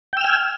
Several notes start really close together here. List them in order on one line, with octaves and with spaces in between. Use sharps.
G5 E6 F6 G#5